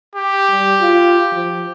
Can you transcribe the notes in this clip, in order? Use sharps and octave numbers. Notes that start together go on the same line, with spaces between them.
G4
G3
F4
F3